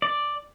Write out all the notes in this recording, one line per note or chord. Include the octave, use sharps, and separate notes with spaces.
D5